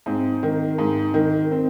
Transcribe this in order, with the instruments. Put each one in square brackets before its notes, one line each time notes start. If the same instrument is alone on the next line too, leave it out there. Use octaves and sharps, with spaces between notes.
[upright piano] G#2 C4
D#3
G#2
D#3
C4